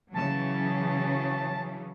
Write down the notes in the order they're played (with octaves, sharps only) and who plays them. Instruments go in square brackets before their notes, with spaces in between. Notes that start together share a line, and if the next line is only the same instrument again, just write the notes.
[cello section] C#3 E3 F#3 [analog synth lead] A5